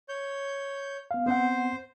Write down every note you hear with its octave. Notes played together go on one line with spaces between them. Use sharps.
C#5 G6
B3 F5
B3 C4 C5 F#5